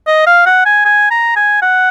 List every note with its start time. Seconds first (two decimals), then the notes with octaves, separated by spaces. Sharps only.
0.07 D#5
0.26 F5
0.46 F#5
0.66 G#5
0.85 G#5
1.11 A#5
1.36 G#5
1.62 F#5